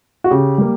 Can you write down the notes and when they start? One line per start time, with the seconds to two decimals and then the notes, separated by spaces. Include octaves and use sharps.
0.24 F#4
0.31 C#3 G4
0.58 G3 A#3